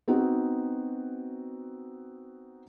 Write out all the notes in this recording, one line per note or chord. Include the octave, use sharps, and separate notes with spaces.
B3 C4 D#4 F#4